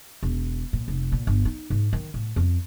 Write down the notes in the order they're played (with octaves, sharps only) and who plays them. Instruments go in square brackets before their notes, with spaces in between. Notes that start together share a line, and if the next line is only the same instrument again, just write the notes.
[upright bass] E1
A#2
F1
A#2
G1
D#4
G#2
D#3
A2
F2